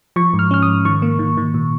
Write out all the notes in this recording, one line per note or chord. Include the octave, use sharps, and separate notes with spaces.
F3 C#6
G#2
F6
C#4 F6
D#6
G#2
D#3 C#6
A#3
D#3
D#3
A#2